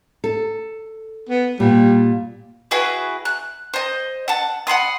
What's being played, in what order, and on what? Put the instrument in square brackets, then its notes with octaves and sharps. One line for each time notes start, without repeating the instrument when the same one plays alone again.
[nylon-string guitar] A4
[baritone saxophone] B3
[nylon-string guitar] A#2 [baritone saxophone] G3
[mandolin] E4 F#4 G#4 B4
F#6
C5 D#5
F#5 A5
F#5 B5 C6 D#6